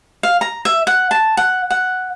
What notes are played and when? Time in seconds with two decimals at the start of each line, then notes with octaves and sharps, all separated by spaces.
0.23 F5
0.41 A#5
0.65 E5
0.87 F#5
1.11 A5
1.37 F#5
1.71 F#5